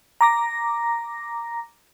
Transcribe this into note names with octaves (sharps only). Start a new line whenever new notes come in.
A#5 D6 A#6